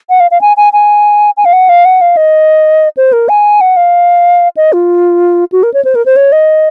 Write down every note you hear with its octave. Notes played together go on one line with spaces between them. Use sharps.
F#5
F5
F5
G#5
G#5
G#5
G#5
F5
F#5
F5
F#5
F5
D#5
C5
A#4
G#5
F#5
F5
D#5
F4
F#4
A#4
C#5
C5
A#4
C5
C#5
D#5